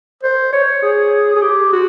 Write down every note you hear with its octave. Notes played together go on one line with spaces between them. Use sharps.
C5
C#5
G#4
G#4
G4
F#4